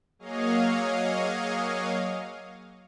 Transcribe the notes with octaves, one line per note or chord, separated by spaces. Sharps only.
F#3 A#3 G#4 C#5 D#5 F5